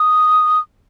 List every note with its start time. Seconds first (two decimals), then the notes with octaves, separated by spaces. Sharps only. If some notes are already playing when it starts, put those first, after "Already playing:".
Already playing: D#6